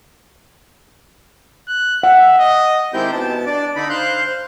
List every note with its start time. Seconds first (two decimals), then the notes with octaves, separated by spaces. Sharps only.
1.68 F#6
2.03 E5 F#5
2.38 D#5
2.94 D#3 G#3 C4 E4 G4 G6
3.12 B2 A5
3.46 D4 D5
3.76 D3 D#4 B5
3.89 C5 F5 F#6 G6